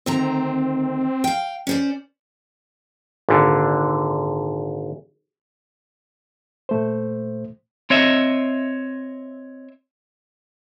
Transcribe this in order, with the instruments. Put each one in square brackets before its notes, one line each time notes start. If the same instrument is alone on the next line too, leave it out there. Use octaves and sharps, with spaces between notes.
[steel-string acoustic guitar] D2 D#3 A#5 [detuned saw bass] C4
[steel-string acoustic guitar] F5 G5
C#4 C5 D5
[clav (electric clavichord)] G#1 A#2 D3
[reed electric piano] A#2 A3 C5
[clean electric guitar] C4 C#5 D#5 E5